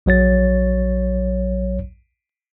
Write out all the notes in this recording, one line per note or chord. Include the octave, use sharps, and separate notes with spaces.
A#1 F#3 C#5 A6